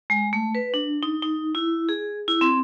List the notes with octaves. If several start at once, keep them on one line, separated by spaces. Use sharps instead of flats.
G#3
A3
B4
D4
D#4
D#4
E4
G#4
E4
C4